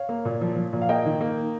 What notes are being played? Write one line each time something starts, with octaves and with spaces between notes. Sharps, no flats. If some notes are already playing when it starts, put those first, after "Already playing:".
Already playing: C#5 F5
A#3
A#2
F3
F3
A#2
F5
A#3 D#5 G5
D#3
A#3